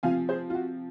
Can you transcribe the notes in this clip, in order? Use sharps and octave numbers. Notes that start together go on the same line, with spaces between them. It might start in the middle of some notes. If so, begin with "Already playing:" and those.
C3 F3 C4 F5 G#5
G#4 C5
F4
F#4